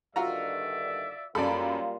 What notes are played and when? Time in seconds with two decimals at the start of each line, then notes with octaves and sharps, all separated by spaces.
0.16 G2 D3 D#3 F4 F#4 D5 E5 A#5
1.35 F#2 G3 A#3 F4 A4 D5 B5